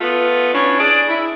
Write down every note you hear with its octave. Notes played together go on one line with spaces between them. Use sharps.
A3 B3 F4
E3 C#4 D4
D4 G#4 D5
E4